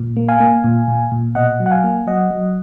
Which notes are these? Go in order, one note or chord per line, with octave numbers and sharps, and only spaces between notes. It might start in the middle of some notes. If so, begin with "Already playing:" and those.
Already playing: A#2
A#3
F5 G#5
A#3
A#2
A#2
A#2
B2 D#5 F#5
F#3
F#5
F5 G#5
A#3
F#3 D#5 F#5
F#3